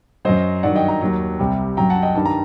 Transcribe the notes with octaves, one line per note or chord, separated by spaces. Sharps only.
F#2 F#3 C5 D#5
G2 D#3 F#3 D5 F#5
D#5 G5
G5 A#5
D#2 D#3 F#3
C2 C3 G3
F#2 F#3 G5 A#5
F#5 A5
D#5 G5
G2 D#3 G3 A5
A#5